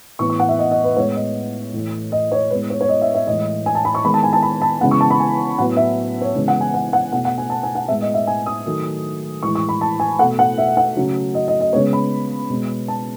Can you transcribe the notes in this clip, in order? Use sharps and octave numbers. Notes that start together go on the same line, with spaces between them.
A2 E3 B3 C#6
C#6
F#5
E5
D#5
D#5
B4
A2 G#3 B3 C#5
D#5
A2 E3 A3
D#5
C#5
A2 G#3 B3 B4
C#5
C#5
D#5
E5
E5
A2 E3 G#3 D#5
G#5
A5
B5
C#6
D#3 G#3 B3 B5
A5
G#5
A5
B5
A5
C#3 E3 G#3 B3 F#5
C#6
A5
B5
G#5
A2 F#3 B3 F#5
E5
C#5
C#3 E3 G#3 B3
F#5
G#5
F#5
F#5
B2 A3 F#5
F#5
G#5
A5
G#5
F#5
A2 G#3 B3 E5
D#5
E5
G#5
D#6
D#3 F#3 A3
A2 E3 G#3 C#6
C#6
B5
A5
G#5
B2 A3 F#5
F#5
E5
F#5
C#3 F#3 A3
D#5
D#5
D#5
C#3 G#3 B3 C#5
B5
B2 G#3 B3
A5